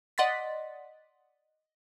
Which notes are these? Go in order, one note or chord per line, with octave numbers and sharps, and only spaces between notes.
D5 D#5 F#5 C6 A6 B6